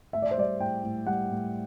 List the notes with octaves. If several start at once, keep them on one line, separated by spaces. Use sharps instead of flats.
A2 E5
D5
C5
G3 D5
A2 G5
A2
G3 F#5
A2